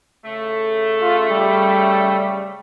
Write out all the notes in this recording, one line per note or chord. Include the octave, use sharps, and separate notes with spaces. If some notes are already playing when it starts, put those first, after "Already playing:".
C#3 A3
F4
G3